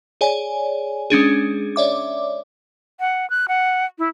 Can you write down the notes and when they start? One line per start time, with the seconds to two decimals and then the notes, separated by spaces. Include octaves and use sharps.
0.21 G#4 C#5 D5 G#5
1.10 G#3 C#4 D4 G#4
1.76 C#5 D5 E5 D6
3.00 F#5
3.30 F#6
3.48 F#5
3.99 E4